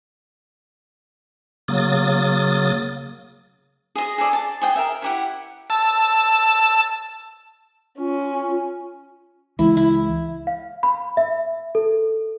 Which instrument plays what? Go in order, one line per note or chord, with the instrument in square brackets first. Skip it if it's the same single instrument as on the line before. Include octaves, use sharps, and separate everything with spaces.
[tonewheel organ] C#3 F#3 A#3 D#6 A6
[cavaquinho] G#4 D#5
G#4 A4 D5
A5
G#4 D#5 G5
A#4 E5
E4 G4 F#5
[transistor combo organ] A5 E6
[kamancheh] C#4 [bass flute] F4
[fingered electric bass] C#2 E3 G#3 [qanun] E4
[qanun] E4
[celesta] F5
B5
E5
A4